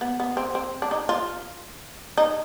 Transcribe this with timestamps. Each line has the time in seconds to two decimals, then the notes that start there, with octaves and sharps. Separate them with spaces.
0.01 B3
0.20 B3
0.37 C4
0.55 C4
0.82 D4
0.91 D#4
1.09 F4
2.18 D#4